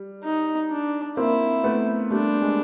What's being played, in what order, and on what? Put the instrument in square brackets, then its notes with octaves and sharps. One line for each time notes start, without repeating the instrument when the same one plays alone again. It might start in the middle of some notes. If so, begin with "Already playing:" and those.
Already playing: [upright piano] G3
[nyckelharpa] D#4
D4
[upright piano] A#3 C4 [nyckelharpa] E4
[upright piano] A3 B3
[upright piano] G3 A3 [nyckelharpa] D4
[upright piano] G#3